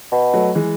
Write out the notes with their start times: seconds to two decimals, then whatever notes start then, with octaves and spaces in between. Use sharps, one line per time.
0.12 B2
0.33 F#3 A3
0.55 E3 G#3